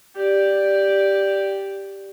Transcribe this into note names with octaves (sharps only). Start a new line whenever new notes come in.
G4 D5